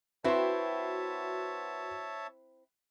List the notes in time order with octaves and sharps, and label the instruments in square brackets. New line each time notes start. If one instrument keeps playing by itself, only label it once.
[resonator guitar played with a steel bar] C4 E4 [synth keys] F#4 [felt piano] B4 C6 [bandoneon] C#5 E5 A5